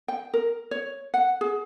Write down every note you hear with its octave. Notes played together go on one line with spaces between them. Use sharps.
G5
A#4
C#5
F#5
G#4